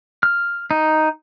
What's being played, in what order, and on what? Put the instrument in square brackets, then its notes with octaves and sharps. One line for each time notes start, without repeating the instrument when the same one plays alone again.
[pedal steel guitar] F6
D#4